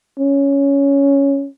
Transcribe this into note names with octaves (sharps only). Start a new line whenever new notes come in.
C#4